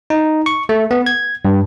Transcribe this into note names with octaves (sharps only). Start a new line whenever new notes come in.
D#4
C#6
A3
B3
G#6
G2